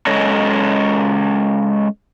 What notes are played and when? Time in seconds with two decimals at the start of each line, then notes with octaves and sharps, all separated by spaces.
0.07 G#3 C#4 A4 C#5 D#5